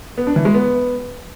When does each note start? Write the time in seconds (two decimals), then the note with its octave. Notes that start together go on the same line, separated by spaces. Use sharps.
0.18 B3
0.27 D4
0.36 E3
0.45 G#3
0.54 B3